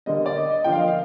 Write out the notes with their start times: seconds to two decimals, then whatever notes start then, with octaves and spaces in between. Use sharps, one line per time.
0.06 D3 G3 A#3 D#5
0.26 D5
0.36 D#5
0.50 D#5
0.64 D3 F3 A#3 G5
0.72 F5
0.79 D#5
0.88 F5